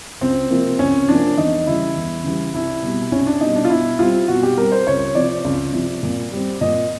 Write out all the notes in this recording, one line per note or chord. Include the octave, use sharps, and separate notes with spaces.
C#2 C4
C3 F3 A#3
C#2 C#4
C3 F3 A#3 D4
E2 D#4
C#3 E3 G3 E4
E2
C#3 E3 G3
C2 E4
B2 G3
C2 C#4
D4
B2 G3 D#4
D4
F4
B2 E4
G3 C4 F4
B2 F#4
G4
G3 C4 A#4
C5
C#2 C#5
C3 F3 D5
C#2
C3 F3
A#2
G3 C4
A#2 D#5